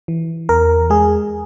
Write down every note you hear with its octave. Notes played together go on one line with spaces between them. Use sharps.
E3
E2 A#4
G#3 G#4